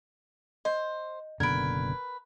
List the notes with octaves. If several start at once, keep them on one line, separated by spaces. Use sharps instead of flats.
C5 D#5
F#1 B2 D3 A#4 B4 G#6 D7